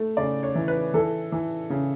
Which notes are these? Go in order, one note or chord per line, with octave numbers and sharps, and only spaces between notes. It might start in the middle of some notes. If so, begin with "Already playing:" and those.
Already playing: A3
C#3 D5
C#5
E3
B4
E3 A4
E3
C#3